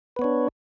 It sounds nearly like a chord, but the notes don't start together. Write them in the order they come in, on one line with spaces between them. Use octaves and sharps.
B4 B3 C#5 D4